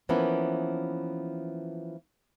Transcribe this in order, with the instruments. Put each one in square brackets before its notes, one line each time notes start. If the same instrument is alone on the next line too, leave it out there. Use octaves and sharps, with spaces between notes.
[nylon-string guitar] E3 F3 A#3 B3 C#4